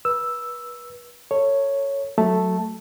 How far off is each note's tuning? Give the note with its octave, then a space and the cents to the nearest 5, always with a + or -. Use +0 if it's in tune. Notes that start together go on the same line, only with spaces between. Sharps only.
B4 -30 E6 +0
A4 +30 C#5 +0
F#3 +0 A3 +0 A5 +0